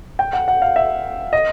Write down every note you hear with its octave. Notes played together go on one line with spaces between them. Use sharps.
G5
F#5
F#5
F5
E5
D#5